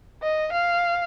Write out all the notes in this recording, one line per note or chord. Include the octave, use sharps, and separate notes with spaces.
D#5
F5